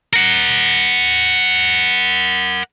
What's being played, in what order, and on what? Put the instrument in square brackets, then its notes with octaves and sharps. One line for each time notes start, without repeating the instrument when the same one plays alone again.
[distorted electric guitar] A#4 F#5